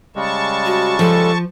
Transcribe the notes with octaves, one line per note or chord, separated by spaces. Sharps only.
C#3 G3 G#3 A5 C#6
F#4
F3 A4